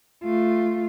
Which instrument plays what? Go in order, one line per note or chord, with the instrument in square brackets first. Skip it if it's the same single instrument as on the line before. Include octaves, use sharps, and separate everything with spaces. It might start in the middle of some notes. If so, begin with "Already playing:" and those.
[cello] A3 F4